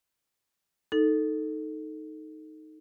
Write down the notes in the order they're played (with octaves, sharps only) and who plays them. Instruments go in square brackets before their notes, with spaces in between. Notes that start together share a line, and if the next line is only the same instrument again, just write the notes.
[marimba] D#4 A4